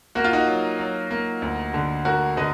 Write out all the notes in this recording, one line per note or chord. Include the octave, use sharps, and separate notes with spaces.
A#3 F#4
F4
D#4 F#4
F#3
F#3
A#3
D2
D3
D2 F#4 A#4
D3 B4 D#5